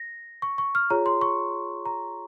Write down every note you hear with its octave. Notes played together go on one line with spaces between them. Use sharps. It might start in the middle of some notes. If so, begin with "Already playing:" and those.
Already playing: A#6
C#6
C#6
F6
F4 G#4 C#5 A#5
C6
C#6
A#5